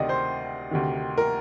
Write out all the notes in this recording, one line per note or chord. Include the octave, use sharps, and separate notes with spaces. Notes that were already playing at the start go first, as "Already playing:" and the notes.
Already playing: D2 C3 D#3 D5 D#5
C5
D2 C3 D#3
A#4